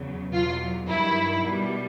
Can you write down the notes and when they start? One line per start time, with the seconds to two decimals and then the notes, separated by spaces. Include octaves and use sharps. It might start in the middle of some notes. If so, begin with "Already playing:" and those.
Already playing: E2 C#3 F#3
0.32 E2 B2 F#3 F4
0.89 G2 D#3 F#3 E4
1.44 B2 G3